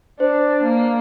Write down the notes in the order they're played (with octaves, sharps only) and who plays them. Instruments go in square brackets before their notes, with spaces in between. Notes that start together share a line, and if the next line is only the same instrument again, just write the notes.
[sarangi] D4 [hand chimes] C5
[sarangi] A#3